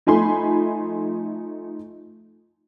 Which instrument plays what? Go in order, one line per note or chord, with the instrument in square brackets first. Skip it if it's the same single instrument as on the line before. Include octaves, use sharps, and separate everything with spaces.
[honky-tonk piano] F3 A3 D#4 G#5 B5 C6